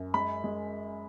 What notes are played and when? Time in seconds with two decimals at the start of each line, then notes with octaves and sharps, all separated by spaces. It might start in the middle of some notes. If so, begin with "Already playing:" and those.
Already playing: F#2
0.14 G#3 B5
0.44 G#3